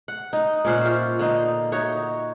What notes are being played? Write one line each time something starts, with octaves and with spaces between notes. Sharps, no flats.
F#5
D#4
A#2 C#4 C5 F#5
F4 E5
D3 D#4
D#4 F#4 C#5 E5